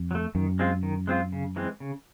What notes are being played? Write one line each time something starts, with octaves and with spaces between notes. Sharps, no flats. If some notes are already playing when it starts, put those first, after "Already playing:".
Already playing: F2
F#3
A3
F#2 D#3
G#3 C4 F4
D#3
G#3 C4 F4
C#3
E3 G#3 C4
C#3